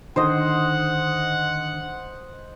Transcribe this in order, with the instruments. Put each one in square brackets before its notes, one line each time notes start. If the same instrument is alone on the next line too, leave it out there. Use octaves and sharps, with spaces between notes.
[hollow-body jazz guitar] D3 D#3 [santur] C5 D#5 [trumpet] F#5